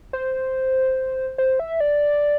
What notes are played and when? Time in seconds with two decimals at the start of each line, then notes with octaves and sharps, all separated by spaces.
0.13 C5
1.38 C5
1.60 E5
1.80 D5